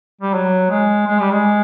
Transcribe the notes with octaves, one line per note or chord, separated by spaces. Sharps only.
G3
F#3
G#3
G#3
G3
G#3